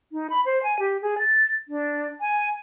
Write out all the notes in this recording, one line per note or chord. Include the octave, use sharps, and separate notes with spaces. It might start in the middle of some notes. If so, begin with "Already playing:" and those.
D#4
B5
C5
G#5
G4
G#4
A6
D4
G#5